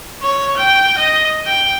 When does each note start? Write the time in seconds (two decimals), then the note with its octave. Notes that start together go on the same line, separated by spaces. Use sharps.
0.23 C#5
0.57 G5
0.98 D#5
1.46 G5